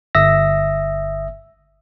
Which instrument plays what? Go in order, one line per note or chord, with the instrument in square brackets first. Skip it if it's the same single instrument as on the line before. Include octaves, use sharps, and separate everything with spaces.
[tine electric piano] G1 E5 D#6 E6 A#6